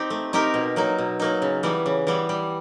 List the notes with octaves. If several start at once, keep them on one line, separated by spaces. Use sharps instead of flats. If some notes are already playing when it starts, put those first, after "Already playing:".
Already playing: C4 D#4 G4
A3
C4 D#4 G4 A#4
B2
F#3 A#3 D#4
B2
F#3 A#3 D#4
C#3
E3 G3 B3
C#3
E3 G3 B3
G3